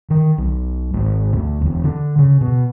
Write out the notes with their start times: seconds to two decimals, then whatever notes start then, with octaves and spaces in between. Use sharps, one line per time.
0.10 D#3
0.38 B1
0.94 G#1
1.33 D2
1.61 E1
1.84 D3
2.18 C#3
2.41 B2